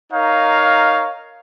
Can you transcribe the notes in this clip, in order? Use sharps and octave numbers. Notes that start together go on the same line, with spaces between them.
D#4 A#4 C#5 F5